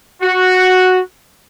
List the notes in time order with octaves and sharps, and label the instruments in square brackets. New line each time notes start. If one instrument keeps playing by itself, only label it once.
[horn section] F#4